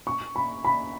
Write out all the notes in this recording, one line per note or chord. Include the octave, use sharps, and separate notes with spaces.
C#6
B5
B5